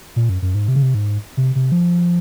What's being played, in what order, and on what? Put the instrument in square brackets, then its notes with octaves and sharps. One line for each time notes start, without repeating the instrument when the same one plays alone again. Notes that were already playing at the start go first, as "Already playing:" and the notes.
[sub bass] A#2
F#2
F#2
G#2
C3
C#3
C3
G#2
C3
C3
F3